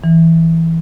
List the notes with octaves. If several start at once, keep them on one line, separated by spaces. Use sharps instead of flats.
E3